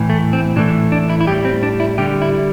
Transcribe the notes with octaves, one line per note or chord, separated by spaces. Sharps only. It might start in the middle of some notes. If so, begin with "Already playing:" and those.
Already playing: A2 E3
A3
C4
A2 E3 A3 D4
D4
E4
E4
A2 G3 G4
C4
D4
E4
D3 G3 G4
E4